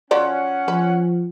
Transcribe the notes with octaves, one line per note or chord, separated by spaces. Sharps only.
F3 F#3 C#4 D5 F#5
F3 B4